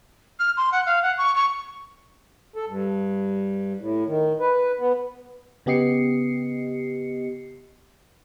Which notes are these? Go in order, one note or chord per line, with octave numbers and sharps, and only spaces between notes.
F6
C6
F#5
F5
F#5
C#6
C#6
A4
G2
A2
D#3
B4
B3
C#3 B3 G4 D#5 C7 C#7